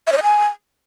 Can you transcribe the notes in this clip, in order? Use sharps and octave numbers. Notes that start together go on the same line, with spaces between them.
E5
C#5
D#5
G#5